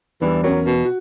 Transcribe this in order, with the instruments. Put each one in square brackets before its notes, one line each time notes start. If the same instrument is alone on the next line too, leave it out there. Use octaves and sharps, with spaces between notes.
[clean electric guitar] E2 [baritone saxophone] E3 [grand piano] G3 D4
[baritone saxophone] F#3 [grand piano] C#4 A#4
[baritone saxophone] B2
[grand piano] F#4